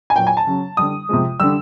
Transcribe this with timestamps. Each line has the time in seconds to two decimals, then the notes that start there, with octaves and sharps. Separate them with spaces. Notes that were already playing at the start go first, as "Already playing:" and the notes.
0.10 G#5
0.16 A#2 F#3 G5
0.27 G#5
0.37 A5
0.47 C#3 F#3
0.77 D3 G3 D#6
1.09 C3 F3 G#3
1.39 D3 G3 E6